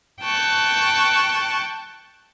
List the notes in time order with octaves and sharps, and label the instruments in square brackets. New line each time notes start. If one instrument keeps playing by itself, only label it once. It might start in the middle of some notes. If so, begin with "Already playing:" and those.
[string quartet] G5 A5 C#6 F#6